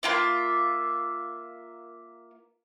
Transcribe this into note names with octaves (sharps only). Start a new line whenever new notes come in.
A#3 F4 E5